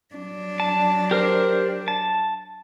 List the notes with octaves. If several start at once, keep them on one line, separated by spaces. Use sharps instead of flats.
F#3 D4
A5
G4 A#4 C5
A5